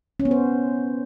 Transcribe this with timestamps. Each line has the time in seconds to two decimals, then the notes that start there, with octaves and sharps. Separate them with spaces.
0.20 C#4
0.25 B3
0.31 C5